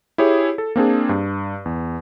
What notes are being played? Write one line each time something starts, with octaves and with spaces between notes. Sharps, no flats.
E4 G4 G#4 C#5
A4
A#3 C4 D4 G#4
G2
E2